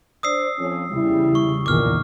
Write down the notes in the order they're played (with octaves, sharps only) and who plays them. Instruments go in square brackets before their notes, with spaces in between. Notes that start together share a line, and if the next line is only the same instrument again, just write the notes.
[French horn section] D4 C5 D5 [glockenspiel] D#6 E6 C7
[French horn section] F2 C#4
[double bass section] E2 C#3 G3 [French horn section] E4
[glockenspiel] C#6
[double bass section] A#1 E2 D#3 [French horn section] A#2 [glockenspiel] D6 F6